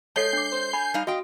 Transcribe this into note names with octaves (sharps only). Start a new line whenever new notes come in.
G#3 A4 C#5 A5 G6 C7
D4 D6
C5
G#5 B5
G3 D#4 F5
F#4 D#5 F5 G5 D#6